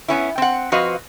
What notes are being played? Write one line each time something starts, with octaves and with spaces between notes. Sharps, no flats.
B3 C#4 E4
C4 F#5
F3 C4 F#4 B4 D#5 F5